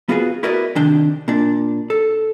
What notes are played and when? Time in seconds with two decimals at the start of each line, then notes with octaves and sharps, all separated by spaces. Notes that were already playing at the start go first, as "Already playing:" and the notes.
0.09 B3 F4 F#4 G#4 B4
0.43 E4 F#4 A#4 B4 D5 D#5
0.75 C3 D#3 D4 G5
1.28 A#2 D4
1.90 A4